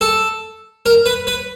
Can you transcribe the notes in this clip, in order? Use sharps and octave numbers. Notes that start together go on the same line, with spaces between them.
A4
A#4
B4
B4